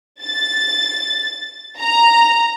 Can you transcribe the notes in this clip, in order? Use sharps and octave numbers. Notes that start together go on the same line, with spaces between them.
A6
A#5